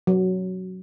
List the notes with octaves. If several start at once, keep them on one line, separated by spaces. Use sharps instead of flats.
F#3